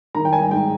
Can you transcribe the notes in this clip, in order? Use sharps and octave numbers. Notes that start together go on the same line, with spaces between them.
D#3 A#5
G5
G#5
G#2 G5